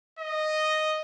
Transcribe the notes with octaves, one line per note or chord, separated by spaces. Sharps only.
D#5